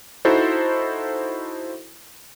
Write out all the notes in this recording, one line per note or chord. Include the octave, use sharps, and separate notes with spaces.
D#4 E4 F#4 A4 C5